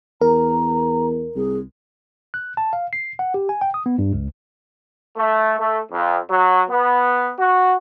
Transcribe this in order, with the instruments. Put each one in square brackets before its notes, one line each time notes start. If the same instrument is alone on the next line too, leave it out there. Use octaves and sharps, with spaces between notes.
[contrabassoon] E2 [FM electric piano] A#4 [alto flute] A#5
[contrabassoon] C2 [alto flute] G#4
[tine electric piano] F#6
A5
F5
C7
F#5
G4
G#5
G5
D#6
B3
G2
C#2
[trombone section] A3
A3
F2
F#3
B3
F#4